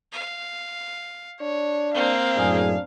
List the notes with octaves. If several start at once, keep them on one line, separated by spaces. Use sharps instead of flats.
F5
D4 C#5
A#3 C4 F5
F#2 A2 D4 G#4